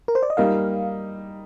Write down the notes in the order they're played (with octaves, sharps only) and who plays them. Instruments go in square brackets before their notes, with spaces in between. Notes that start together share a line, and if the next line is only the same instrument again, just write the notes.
[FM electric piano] A#4
C5
D5
D#5
[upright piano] G3 A#3 D#4 [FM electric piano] F5